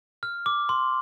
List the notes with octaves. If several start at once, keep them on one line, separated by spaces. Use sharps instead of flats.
F6
D6
C6